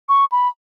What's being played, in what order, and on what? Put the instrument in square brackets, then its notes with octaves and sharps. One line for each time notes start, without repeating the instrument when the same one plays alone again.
[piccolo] C#6
B5